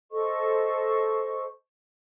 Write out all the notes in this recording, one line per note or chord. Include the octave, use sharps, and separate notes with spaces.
A4 C5 D#5 C#6